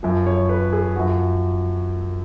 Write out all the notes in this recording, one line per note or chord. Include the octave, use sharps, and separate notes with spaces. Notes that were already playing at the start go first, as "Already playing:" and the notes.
F#2 F3
C#5
B4
G#4
F#2 F3 F#4